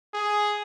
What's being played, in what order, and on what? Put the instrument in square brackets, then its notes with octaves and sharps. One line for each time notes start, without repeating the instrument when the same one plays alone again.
[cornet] G#4